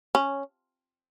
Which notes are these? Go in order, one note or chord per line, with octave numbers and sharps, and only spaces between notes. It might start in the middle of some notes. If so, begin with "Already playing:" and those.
C#4